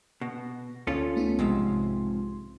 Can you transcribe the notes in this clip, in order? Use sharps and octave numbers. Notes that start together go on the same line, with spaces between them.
B2 A#6
D2 C#4 F4 A4
A3 B3 D#4
B1 G#2 C3 F3 G#3 C6